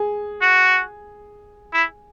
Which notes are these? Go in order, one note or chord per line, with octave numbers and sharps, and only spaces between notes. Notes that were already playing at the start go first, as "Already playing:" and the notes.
Already playing: G#4
F#4
E4